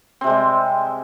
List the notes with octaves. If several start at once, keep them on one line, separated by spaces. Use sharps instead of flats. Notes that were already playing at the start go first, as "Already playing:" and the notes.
C3 G3 G#3 C4